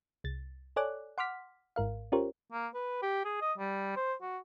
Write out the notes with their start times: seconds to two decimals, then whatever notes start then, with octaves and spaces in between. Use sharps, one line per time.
0.24 C2 A6
0.76 A4 C#5 D5 G#5 D6 F#6
1.18 F#5 C6 D6 F6 B6
1.76 G#1 G#2 A#4 F5
2.12 C#4 F4 G4 A#4 C5 C#5
2.53 A#3
2.74 B4
3.02 G4
3.25 G#4
3.41 D#5
3.58 G3
3.96 C5
4.22 F#4